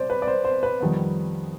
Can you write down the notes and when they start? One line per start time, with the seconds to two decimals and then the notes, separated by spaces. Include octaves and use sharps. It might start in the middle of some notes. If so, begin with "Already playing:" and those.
Already playing: C3 G3 C5 D5
0.10 B4
0.22 D5
0.28 C5
0.44 C5
0.63 B4
0.81 F2 D#3 G3 B3